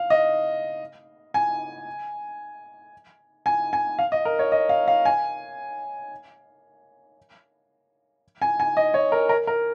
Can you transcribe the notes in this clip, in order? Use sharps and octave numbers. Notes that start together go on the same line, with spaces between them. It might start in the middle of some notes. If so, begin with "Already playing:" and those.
Already playing: F5
D#5
G#5
G#5
G#5
F5
D#5
A#4
C#5
D#5
F5
F5
G#5
G#5
G#5
D#5
C#5
A#4
A#4
A#4